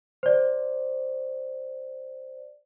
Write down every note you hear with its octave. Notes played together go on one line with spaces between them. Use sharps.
C5 D5